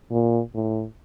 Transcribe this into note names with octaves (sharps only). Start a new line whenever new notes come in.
A#2
A2